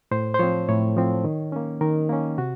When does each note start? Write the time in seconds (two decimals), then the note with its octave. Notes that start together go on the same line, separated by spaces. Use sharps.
0.11 A2 C5
0.34 C5
0.39 F3 C4 C#5
0.68 A2 C#5
0.96 F3 C4
1.24 D#3
1.52 A#3 C#4
1.81 D#3 A#4
2.09 A#3 C#4
2.38 C3 F#4